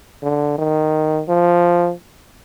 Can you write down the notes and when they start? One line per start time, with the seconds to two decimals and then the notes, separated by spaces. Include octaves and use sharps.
0.23 D3
0.58 D#3
1.29 F3